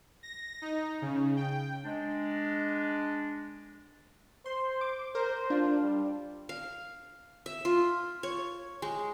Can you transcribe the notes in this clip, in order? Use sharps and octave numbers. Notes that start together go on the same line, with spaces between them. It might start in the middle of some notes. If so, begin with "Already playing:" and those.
A#6
D#4
C#3
G5
G#3 D4
C5 C6
D6
A#4 C5
D4 F4
G3
F5
E5
F4
C#5
G#3